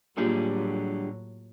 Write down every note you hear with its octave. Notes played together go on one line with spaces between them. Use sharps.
A2 D3 F#3 G3 A#3 F4 G4 G#4